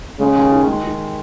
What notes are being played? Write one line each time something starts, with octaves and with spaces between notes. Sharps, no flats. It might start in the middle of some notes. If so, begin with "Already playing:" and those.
C#3 G#3
D#2
D#3
G#3
D#3